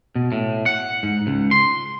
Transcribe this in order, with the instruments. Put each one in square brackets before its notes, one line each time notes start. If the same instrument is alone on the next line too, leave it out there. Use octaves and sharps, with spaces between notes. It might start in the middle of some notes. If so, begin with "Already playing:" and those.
[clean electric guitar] B2
A2
F#5
G#2
C#2
C6